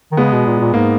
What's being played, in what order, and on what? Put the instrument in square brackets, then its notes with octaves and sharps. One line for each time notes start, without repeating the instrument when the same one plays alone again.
[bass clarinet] D#3
[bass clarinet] C#3 [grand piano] G#3 B3
[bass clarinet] B2
A#2
A#2
[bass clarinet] G#2 [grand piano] A#3